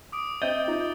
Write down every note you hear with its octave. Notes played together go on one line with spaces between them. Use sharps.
D6 D#6 D7
C4 D#5 E5 G6 A6 G7
D#4 F4